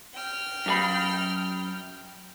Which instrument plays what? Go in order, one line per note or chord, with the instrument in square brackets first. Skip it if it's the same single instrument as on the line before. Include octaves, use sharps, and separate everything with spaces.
[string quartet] G5 F6
[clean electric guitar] F#2 G4 B5